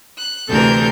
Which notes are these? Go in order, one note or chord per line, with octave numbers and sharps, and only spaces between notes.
F#6
D2 C3 E3 A4 A#4 G6